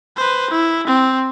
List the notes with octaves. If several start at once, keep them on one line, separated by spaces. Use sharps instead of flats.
B4 C5
E4
C4